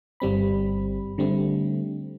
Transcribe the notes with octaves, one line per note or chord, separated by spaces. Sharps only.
G1 G3 C4 B5
D3 G3 A3 C4